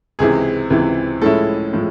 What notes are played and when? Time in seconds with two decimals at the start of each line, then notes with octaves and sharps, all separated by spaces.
0.19 C#2 C3 E3 G#4
0.70 C#2 C3 E3
1.22 A2 F3 G#3 C#4 E4 A4
1.73 A2 F3 G#3